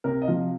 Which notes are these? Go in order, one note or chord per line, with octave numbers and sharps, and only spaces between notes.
C3 A#4
D#5
F3 F5